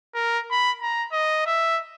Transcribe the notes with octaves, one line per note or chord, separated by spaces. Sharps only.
A#4
B5
A#5
D#5
E5